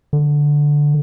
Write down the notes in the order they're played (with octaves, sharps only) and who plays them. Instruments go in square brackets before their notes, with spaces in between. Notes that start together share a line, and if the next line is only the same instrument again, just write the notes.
[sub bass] D3